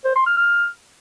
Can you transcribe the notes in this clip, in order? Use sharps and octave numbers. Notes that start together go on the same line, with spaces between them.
C5
C6
F6
F6